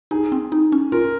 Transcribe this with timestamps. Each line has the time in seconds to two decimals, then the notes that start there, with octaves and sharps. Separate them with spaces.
0.11 D#4 G#4
0.32 C4
0.52 D#4
0.72 C#4
0.92 F4 A#4